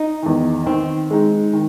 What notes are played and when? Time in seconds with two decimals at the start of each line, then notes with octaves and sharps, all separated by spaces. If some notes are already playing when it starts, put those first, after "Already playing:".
Already playing: D#4
0.22 E2 D#3
0.66 D#3 C4
1.10 G#3 D#4
1.53 D#3